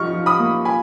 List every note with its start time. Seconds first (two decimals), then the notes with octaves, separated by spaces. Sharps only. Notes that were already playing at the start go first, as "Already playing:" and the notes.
Already playing: F3 D#4 C#6 F6
0.13 F3
0.26 B5 D#6
0.39 A#3
0.65 F4 G#5 B5